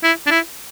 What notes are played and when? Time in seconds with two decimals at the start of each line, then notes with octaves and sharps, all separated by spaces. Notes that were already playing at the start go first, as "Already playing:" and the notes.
0.04 E4
0.27 D4
0.31 E4